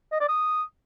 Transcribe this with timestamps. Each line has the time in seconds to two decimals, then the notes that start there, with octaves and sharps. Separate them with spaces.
0.12 D#5
0.20 D5
0.29 D#6